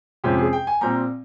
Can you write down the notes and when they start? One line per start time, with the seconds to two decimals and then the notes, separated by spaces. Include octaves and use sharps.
0.24 F2 C3 F3 G#3 C#4 G4
0.38 G#4
0.53 G5
0.67 G#5
0.81 A#2 G3 C4 A#5